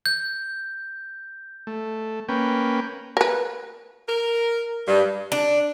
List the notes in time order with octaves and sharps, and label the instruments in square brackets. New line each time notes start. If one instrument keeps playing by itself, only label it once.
[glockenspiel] G6
[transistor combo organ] A3
A#3 C#4 B4 G5
[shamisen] A#4 B4
[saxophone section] A#4
G2
[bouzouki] D4